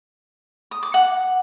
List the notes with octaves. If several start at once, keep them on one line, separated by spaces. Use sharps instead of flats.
D#6
D6
F#5